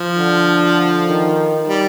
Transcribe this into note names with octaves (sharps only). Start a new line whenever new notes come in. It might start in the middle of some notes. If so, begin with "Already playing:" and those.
Already playing: F3
D3
D#3
G3